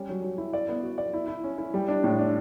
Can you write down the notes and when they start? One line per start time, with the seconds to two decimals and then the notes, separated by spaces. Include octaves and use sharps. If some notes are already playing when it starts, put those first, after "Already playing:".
Already playing: G3 C#4
0.09 F#3
0.23 F#3
0.38 E4
0.53 D5
0.69 B3
0.83 F#4
0.98 D5
1.13 E4
1.28 E4
1.44 C#4
1.58 E4
1.74 G3
1.88 D4
2.04 A2
2.19 D4